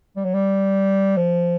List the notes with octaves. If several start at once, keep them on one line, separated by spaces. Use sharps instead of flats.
G3
F#3
G3
F3